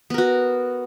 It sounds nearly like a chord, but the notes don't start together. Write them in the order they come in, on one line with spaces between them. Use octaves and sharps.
B3 A#4 F#4